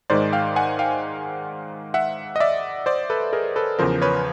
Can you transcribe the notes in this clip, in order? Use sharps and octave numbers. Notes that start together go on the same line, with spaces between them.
G#2 D#3 G#3 C5 D5
F5 G5
F#5 G#5
F5 G5
E5 F#5
D#5
D5 E5
C5 D5
A4 B4
G#4 A#4
A4 B4
E2 C#3 F3 A#4 C5
B4 C#5